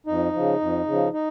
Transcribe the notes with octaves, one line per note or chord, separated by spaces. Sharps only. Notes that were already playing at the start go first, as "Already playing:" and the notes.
F2 D#4
C#3 F3
F2
C#3
F3
D#4